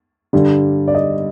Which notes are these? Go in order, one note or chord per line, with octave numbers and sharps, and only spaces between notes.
G2 D3 G3
D5
D#5